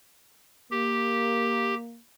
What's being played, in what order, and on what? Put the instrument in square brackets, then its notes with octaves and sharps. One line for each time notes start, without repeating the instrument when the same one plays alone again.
[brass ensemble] A#3 [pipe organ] G4